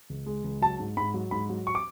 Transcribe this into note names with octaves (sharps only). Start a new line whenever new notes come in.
C#2
G#3
C#2
F#3 A5
G#2
G#2 B5
F#3
G#2 B5
F#3
C#6
D6